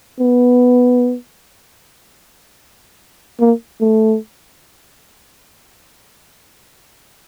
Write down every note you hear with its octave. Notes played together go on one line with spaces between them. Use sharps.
B3
A#3
A3